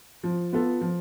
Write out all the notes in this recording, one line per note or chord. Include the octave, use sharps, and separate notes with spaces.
F3
B3 F4 A4
F3